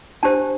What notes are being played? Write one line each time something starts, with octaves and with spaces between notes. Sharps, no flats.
D4 G4 C5 A5